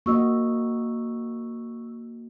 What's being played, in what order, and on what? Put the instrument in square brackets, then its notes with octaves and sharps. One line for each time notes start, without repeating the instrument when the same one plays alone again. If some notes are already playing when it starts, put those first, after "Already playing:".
[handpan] A#3 F#4 D#5 [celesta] C#6 E6